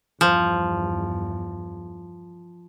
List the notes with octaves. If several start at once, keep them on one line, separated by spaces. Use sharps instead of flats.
E2 G2 F3